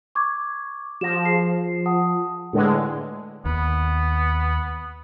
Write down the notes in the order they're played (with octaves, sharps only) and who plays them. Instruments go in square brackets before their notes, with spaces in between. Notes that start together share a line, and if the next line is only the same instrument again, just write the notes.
[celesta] C#6 D6 G#6
[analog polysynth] F3 [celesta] A#6 E7
[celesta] G#4 C7
F#5 A5 D#6
[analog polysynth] A2 D3 G#3 [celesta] G#4 B4
[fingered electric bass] D#2 [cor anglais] B3